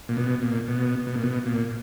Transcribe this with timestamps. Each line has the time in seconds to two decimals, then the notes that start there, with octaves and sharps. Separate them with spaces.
0.09 A#2
0.17 B2
0.42 A#2
0.68 B2
1.07 B2
1.15 A#2
1.23 B2
1.46 A#2